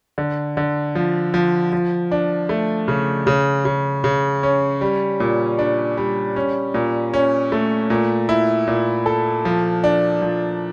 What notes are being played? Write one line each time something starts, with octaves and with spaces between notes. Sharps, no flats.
D3
D3
F3
F3
F3
D4
A3
C#3
C#3
C#3
C#3
C#4
G3
A#2
D4
G3
C#4
A#2
C#4
A3
A#2
E4
A#2
A4
F3
D4
F3